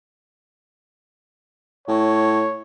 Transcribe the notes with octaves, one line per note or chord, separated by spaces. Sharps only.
A2 C#5